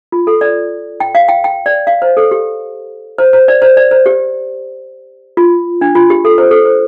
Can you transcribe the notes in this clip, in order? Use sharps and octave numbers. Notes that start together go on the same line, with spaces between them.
F4
A4
D5
G5
F5
G5
G5
D5
F5
C5
A4
G4
C5
C5
D5
C5
D5
C5
G4
F4
D4
F4
G4
A4
C5
A4
C5